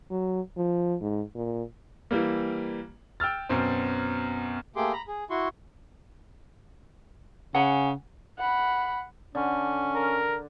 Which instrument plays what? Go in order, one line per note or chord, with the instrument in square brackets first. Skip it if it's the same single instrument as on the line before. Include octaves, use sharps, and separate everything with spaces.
[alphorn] F#3
F3
G#2
A#2
[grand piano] E3 G3 A#3
G5 E6 F6 A6
F#2 B2 C4
[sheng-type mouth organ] A3 A#3 G4 G#4 C6 D6
A#5 B5
G#4
E4 F#4 C6 C#6
[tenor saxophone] C#3 [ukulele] F#5 G#5
[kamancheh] F#5 B5
[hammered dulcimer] D3 [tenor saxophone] C#4
[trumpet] A#4